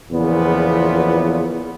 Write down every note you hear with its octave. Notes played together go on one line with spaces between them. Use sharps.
E2 A#2 C#3 F3 B3